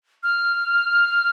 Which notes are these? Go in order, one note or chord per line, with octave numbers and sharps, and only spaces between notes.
F6